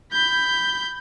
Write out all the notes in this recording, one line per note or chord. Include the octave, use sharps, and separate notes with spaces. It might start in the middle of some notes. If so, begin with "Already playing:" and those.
B5 G6